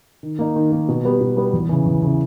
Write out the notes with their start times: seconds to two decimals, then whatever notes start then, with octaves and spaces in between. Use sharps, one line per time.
0.23 D#3
0.39 A#3 D#4
0.56 D#3
0.72 A#3 D#4
0.89 B2
1.04 G3 B3 G4
1.21 B2
1.37 G3 B3 G4
1.53 E2
1.69 C#3 E3
1.86 E2
2.02 C#3 E3